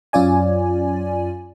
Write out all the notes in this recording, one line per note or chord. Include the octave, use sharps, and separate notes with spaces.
F#2 C#4 F4 D5 G#5